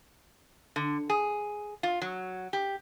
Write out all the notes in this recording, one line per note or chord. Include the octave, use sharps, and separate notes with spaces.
D3
G#4
F4
F#3
G4